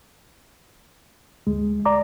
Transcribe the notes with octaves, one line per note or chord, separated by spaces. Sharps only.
D2 G#3
D5 A#5 D6